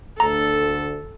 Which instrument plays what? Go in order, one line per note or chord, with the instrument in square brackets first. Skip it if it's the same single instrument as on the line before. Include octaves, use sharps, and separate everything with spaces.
[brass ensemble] D2 [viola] A4 [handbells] A#5